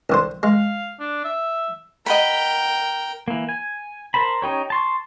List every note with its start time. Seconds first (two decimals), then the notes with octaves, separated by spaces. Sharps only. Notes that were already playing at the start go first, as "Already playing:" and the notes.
0.10 C2 D3 C5
0.43 G#3 F5
1.00 D4
1.24 E5
2.06 A#4 D#5 F#5 G5 B5
3.28 E3 A#3
3.49 G#5
4.14 A#4 C5 A5 B5
4.42 C#4 D#4 G4 C#5
4.70 A5 C6 C#6